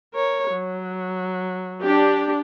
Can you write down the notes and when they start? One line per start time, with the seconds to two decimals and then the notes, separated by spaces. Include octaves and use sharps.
0.14 A#4 C#5
0.52 F#3
1.84 D4 G4